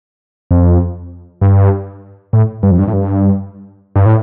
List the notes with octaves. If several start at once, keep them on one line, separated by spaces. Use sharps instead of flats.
F2
G2
A2
G2
F2
G2
A2
G2
G2
A2